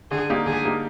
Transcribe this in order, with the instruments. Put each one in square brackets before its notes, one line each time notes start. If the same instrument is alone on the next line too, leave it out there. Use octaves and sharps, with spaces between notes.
[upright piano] D3 [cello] G#4
[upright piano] G3 A#3 D#4 G4
[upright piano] D3 [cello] G#4
[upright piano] G3 A#3 D#4 G4